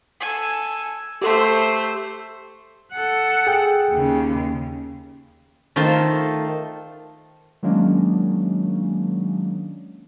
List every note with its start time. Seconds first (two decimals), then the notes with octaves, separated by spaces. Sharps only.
0.21 A4 G#5
1.22 A3 G4 A4 C5 C6
2.93 A4 F#5
3.47 G#4 G5
3.90 D#2 C#3
5.76 D#3 A3 F4 A4 C5
7.63 D#3 F#3 G#3 A#3 C#4 D4